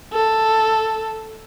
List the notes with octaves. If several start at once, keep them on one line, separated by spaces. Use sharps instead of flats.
A4